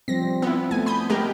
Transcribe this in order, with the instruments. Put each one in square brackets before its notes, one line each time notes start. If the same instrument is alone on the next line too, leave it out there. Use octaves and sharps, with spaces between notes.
[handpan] F3 G3 C4 [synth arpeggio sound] A#6
[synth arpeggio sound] B3 E4
[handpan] A3 B3 [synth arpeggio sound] G#5
[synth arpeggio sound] B5 D#6 G6
G#3 G4 A#4